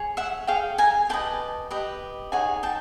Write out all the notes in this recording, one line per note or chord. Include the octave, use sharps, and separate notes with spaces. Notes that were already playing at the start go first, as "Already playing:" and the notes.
Already playing: G#4 C#5
E5 F#5
G#4 C#5 F5 G5
G#5 A#5
G4 B4 D#5 G5 A5
G4 B4 D#5
D#4 G#4 C#5 F#5 G#5
G5 A5